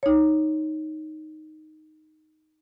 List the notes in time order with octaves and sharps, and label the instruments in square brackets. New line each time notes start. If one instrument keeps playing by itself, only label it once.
[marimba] D#4 C#5